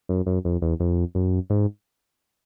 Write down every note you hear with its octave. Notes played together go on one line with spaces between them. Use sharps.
F#2
F#2
F2
E2
F2
F#2
G#2